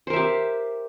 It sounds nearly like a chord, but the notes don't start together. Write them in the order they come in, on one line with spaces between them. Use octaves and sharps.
C5 A#4 E5 G4